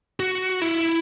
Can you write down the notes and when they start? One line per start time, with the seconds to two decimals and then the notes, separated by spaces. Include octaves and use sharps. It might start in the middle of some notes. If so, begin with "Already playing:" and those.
0.20 F#4
0.62 E4